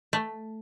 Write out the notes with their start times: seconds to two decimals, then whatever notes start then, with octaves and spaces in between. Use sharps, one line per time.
0.13 A3